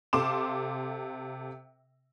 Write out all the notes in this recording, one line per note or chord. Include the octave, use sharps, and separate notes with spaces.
C3 A4 F5 C6 D6 E7